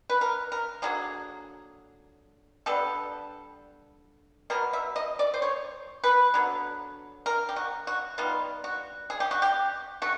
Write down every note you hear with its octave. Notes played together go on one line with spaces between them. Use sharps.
B4
A#4
A#4
D3 F#3 A#3 G#4
D3 G3 B3 A4
B2 F#3 B3 A#4
E5
D#5
D5
C5
C#5
B4
D3 F#3 B3
A#4
G4
F#4
F#4
D#3 G3 B3 F4
F#4
G#4
G4
F#4
G4
A3 F#4